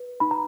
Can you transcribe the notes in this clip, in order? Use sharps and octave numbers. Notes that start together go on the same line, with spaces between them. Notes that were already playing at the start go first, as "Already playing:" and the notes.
Already playing: B4
D#4 B5
A#5